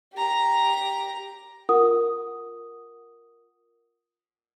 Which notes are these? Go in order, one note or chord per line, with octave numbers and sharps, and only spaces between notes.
G4 A#5
F4 A#4 F#5 D#6